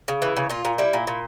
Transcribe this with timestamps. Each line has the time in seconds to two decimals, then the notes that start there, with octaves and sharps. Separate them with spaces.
0.08 C#3
0.22 E3
0.37 C#3
0.50 A#2 F4
0.65 A#2
0.78 G3 E4
0.93 A#2
1.07 A#2